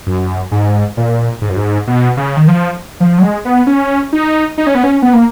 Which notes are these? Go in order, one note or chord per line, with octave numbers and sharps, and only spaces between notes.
F#2
G#2
A#2
G#2
F#2
G#2
B2
C#3
D#3
F3
F3
F#3
G#3
B3
C#4
D#4
D#4
C#4
B3
C#4
B3
A#3